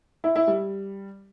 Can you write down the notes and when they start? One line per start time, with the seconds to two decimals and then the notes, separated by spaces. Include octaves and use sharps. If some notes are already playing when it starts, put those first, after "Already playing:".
0.24 E4
0.36 E4
0.47 G3